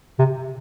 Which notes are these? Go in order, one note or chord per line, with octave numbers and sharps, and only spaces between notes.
C3